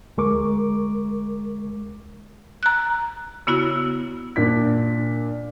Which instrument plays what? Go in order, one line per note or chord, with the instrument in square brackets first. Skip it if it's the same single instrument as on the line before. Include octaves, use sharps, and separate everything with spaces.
[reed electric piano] D2 G#3 A#4 C#6 D6
[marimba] A#5 F#6
C#3 B3 E4 F#4 E6
[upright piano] A#2 D4 B6